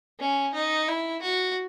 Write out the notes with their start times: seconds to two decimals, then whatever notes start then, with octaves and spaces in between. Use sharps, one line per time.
0.19 C#4
0.54 D#4
0.88 E4
1.22 F#4